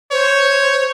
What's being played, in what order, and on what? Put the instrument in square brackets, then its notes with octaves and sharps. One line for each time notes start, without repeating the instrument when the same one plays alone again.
[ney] C5 [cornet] C#5